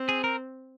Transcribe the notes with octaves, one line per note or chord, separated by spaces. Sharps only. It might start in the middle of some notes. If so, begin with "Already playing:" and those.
Already playing: C4
G#4
A#4